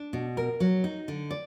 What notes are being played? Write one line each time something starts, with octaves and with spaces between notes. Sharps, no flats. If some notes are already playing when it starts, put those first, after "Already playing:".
Already playing: D4
B2
A#4
F#3
D#4
D3
D5